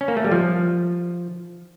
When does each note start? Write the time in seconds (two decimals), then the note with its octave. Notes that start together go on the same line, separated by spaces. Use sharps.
0.01 C#4
0.08 A#3
0.17 A3
0.24 G3
0.31 F3